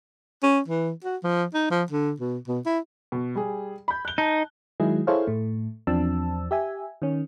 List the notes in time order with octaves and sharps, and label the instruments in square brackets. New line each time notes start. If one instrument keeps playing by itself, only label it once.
[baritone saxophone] C#4
E3
F#4
F3
D#4
F3
D3
B2
B2
E4
[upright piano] B2
G3 G#4
B5 G6
F#6 G7
[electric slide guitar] D#4 [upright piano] A5
[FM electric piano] D#3 F#3 G#3 E4 G#4
E4 G#4 A4 C5 C#5 F5
A2 A3
E2 F3 C4 D4 A5 E6
G4 E5 G#5
D#3 C#4